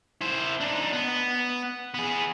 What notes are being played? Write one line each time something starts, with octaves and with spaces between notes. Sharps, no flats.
E4 C5
D4 D#4
B3
B3 G#4